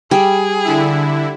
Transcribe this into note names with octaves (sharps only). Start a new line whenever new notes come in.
G3 G#4
D3 E4